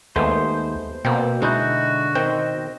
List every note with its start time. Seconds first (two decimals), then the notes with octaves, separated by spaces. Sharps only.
0.16 D#2 G#3 A3 B3 C5
1.05 B2 A#3 C4 G5
1.42 D3 G#3 D#4 E4 F#4 D#5 G6
2.15 D#3 C4 C5 D#5 G5